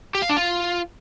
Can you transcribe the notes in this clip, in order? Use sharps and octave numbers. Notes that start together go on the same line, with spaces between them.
G4
F5
D4
F4